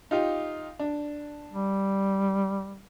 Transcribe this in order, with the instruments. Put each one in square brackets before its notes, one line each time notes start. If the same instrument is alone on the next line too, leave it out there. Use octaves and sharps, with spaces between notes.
[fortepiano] D#4 F4 G4
D4
[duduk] G3